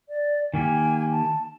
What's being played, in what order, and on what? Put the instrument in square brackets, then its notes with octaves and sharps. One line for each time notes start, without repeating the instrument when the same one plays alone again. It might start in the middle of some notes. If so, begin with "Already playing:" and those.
[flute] D5
[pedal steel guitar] D#3 A#3 G4 [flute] G#5
[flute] A5